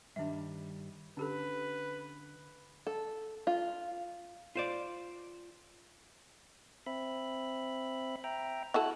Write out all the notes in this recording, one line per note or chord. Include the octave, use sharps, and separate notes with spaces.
G2 D#3 G3 D4 E5
D3 C#4 G4 A4 B4
A4
F4
F4 C5 D5
C4 E5 B5
E5 G5 A#5
E4 F#4 A4 F#6